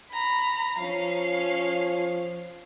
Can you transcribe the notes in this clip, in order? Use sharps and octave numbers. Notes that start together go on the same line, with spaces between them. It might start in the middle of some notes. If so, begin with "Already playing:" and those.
A#5 B5
F3 C#4 F5